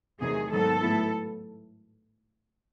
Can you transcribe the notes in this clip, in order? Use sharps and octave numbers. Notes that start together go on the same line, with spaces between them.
E2 C3 D#3 F#3 A3 G#4
G#2 D#3 F#3 B3 A4
A2 F#3 B3 E4